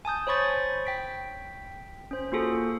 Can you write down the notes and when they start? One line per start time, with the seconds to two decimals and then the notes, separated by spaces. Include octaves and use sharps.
0.05 G#5 A5 D#6 G6
0.27 C5 C#5 B5 C#6 A6
0.85 G5 B6 D7
2.11 C#4 C5
2.32 A#3 F4 F#4 G#4 A4